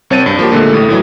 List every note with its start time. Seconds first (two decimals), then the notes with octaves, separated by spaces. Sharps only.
0.10 C2 C4 C#5 A5 A6 D#7
0.26 G2
0.39 F3 A#3 G4
0.52 A#2 D3 G#3 A3
0.73 A1 A2
0.89 A2 E3 F#3